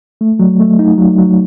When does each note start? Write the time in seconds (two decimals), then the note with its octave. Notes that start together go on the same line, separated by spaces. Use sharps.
0.21 A3
0.39 F#3
0.60 A3
0.79 D#4
0.98 F#3
1.18 F#3